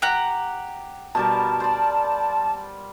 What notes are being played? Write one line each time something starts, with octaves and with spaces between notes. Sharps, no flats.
G4 F#5 A#5
B2 G3 A#4 A5
C5 D5